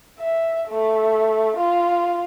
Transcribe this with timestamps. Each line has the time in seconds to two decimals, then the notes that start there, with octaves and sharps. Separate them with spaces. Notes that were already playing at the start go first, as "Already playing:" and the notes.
0.19 E5
0.68 A3
1.57 F4